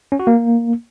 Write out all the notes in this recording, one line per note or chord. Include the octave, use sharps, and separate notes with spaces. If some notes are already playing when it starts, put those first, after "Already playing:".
C#4
F#4
A#3